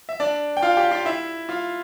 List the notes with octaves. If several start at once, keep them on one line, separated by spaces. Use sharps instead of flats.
E5
D4 D5
G5
F4 F5
G4 G5
F4 F5
E4 E5
F4 F5